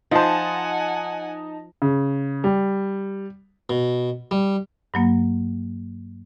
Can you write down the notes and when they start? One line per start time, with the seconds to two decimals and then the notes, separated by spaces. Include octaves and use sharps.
0.11 F3 D#4 C5 F#5 G#5 A5
1.82 C#3
2.44 G3
3.70 B2
4.31 G3
4.94 G2 F#3 A#3